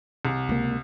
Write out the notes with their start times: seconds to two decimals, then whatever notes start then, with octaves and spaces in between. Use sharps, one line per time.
0.25 C2
0.49 C#2 A#3